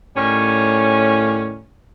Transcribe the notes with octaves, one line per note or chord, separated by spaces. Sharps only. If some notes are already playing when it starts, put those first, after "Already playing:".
A2 D#3 G3 C#4